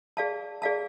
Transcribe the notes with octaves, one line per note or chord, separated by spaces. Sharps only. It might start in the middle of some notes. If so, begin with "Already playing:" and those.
G#4 D5 F5 A5
G#4 D5 F5 A5